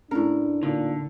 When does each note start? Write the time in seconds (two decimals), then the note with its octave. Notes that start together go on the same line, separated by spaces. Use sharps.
0.11 A2 C#4 D4 A#4
0.63 A#2 D3 D#4